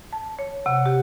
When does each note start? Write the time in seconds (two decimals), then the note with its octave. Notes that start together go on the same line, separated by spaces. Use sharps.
0.13 A5
0.39 C#5
0.66 C3 F#5
0.86 G4